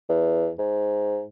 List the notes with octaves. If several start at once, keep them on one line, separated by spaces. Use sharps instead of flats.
E2
G#2